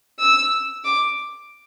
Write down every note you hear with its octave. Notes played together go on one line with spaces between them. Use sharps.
E6
D6